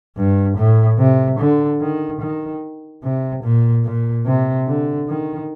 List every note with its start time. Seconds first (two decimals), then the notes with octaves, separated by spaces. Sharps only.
0.17 G2
0.57 A2
0.99 C3
1.39 D3
1.81 D#3
2.21 D#3
3.04 C3
3.44 A#2
3.85 A#2
4.25 C3
4.67 D3
5.08 D#3